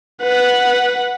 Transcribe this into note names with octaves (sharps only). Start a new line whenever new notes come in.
B4 F#5